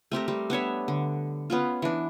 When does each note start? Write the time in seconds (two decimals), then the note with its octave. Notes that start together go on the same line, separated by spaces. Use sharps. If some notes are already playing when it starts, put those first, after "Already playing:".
0.12 A3 C4 G4 A#4
0.28 G3 C4
0.50 B3 D4 C#5 E5
0.88 D3
1.50 B3 C#4 F4
1.82 E3 D4